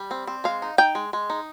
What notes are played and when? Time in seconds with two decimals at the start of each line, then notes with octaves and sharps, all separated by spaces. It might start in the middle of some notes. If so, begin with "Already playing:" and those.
Already playing: G3
0.11 C4
0.27 C4
0.44 G#3 F5
0.62 D#4
0.78 D#4 G5
0.95 G#3
1.13 G#3
1.30 D#4